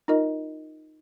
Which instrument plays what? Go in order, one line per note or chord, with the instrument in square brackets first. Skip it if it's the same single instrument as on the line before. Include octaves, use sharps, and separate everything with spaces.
[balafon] D#4 F4 A#4 D#5